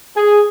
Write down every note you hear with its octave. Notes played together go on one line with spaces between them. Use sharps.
G#4